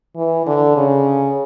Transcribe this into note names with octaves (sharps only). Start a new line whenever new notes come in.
E3
D3
C#3